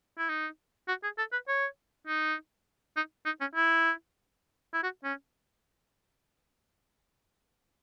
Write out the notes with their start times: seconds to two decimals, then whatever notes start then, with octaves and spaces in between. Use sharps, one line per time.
0.18 E4
0.29 D#4
0.88 F#4
1.03 G#4
1.18 A4
1.32 B4
1.48 C#5
2.07 D#4
2.96 D#4
3.25 D#4
3.40 C#4
3.55 E4
4.73 E4
4.83 F#4
5.04 C#4